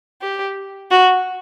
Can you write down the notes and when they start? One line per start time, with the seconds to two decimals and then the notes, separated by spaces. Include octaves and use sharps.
0.22 G4
0.91 F#4